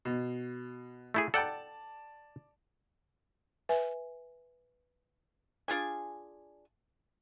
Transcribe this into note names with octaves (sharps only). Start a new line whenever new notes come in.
B2
A3 E4 G#4
A4 D5 F#5 G5 A5
B4 E5 G#5
D4 F4 G#4 G#5